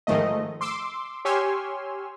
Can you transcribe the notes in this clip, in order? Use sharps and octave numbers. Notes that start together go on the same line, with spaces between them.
G#2 D#3 F3 A3 D#5
C6 D6 E6
G4 C#5 G#5 C6 E6 F6